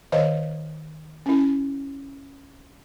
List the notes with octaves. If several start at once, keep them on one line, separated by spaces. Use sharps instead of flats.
D#3 C5 C#5 D#5 F5
C#4 E4